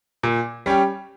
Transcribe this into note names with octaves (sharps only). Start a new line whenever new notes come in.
A#2
G3 C#4 G4